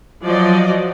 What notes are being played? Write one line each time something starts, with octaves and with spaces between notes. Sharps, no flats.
F3 F#3 D5 D#5